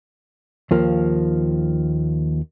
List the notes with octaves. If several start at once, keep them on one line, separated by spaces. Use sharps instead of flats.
D#2 F3 A#3